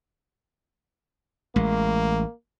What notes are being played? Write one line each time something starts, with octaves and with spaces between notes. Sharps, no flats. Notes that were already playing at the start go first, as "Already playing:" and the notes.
A1 G#3 A#3